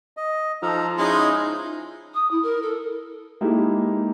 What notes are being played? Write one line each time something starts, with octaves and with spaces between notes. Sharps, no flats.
D#5
F3 D#4 A4 A#5
G#3 C#4 D#4 E4 C6
D#6
E4
A#4
A4
G#3 A#3 D#4 E4 G4 A4